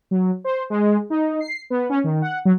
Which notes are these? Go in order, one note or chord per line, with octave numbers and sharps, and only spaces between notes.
F#3
C5
G#3
D#4
C7
B3
C#4
D#3
F#5
F#3